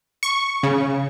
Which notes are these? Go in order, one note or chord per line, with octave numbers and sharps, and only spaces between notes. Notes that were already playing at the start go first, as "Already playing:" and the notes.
C#6
C#3